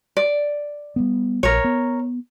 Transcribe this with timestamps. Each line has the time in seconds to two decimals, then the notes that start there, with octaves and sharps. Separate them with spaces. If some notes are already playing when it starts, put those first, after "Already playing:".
0.17 D5
0.96 G3 A#3 B3
1.43 A#1 A#4 C#5
1.64 B3